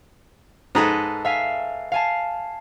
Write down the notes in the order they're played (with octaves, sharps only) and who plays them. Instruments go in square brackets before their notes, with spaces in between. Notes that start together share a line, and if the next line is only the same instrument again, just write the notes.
[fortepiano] G#2 A#5 [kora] A4 B4 D#5
[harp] E5 F5 G#5
F5 G#5 A5